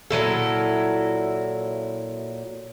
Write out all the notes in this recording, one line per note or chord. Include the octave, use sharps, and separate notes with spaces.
A#2 F#3 E4 A4